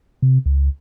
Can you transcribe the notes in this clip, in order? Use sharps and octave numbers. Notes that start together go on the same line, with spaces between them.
C3
C#2